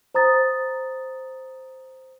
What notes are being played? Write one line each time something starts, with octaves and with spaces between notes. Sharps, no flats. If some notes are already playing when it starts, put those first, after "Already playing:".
C5 A#5 D#6 A6